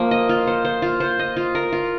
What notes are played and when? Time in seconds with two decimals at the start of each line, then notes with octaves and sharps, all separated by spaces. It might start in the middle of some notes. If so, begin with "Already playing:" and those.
Already playing: F3 A#3
0.11 D#5
0.29 F4
0.47 C5
0.65 C5
0.82 F4
1.00 C5
1.19 D#5
1.37 F4
1.55 A#4
1.72 F4